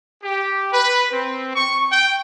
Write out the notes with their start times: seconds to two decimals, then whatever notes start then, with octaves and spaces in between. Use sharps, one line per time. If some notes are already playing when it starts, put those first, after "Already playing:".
0.22 G4
0.73 B4
1.12 C4
1.55 C#6
1.91 G5